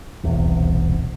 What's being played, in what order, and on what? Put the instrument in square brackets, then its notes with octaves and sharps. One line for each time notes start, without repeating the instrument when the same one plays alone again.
[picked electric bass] D#1 B1 E2 C3